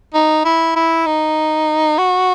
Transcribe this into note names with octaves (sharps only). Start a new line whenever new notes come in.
D#4
E4
E4
D#4
F#4